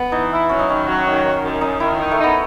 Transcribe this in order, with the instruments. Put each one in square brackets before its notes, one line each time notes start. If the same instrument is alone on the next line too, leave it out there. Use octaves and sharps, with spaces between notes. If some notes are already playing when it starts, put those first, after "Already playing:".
Already playing: [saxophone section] B3
[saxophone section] E3 [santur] D#4
[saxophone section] E4
[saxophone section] F#3 [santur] C#4
[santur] D#4
[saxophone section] D#3 [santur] C#4
[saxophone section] F#3
D#3
D#3
F#2
[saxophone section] F#2 [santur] D#4
[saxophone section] D#3 [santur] E4
[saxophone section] D#4
[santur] A3
[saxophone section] D#4
[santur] B3